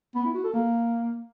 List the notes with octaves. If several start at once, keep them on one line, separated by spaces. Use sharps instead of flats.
B3
E4
F#4
A4
A#3